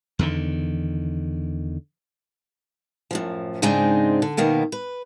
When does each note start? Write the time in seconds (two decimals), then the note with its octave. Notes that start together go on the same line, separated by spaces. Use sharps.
0.19 E2 D3 D#3
3.11 F#2 A2 F3
3.62 G#2 C#3 G#3 C4 D4 D#4
4.22 D3
4.37 B2 D#3 A#3 B3
4.72 B4